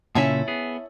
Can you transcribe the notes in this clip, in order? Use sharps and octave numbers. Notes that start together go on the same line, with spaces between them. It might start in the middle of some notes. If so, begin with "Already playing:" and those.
A#2 C#3 C#4 E4 A4 E5
B3 G#4